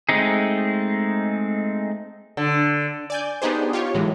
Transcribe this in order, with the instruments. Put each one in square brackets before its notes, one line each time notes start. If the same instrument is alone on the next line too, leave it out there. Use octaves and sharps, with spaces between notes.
[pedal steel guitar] G#3 A3 C4 D#4 G#4
[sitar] D3
[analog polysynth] D5 G#5 G6
B3 D4 D#4 G4 G#4 C5
F4 G4 C#5
A2 E3 F#3 G#3